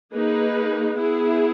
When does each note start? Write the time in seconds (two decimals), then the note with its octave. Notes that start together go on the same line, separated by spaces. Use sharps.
0.13 A#3 D#4 G#4 B4
0.97 B3 E4 G#4